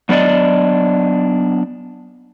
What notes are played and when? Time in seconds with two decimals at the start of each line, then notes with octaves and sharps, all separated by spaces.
0.09 F#3 B3 D4 D5 D#5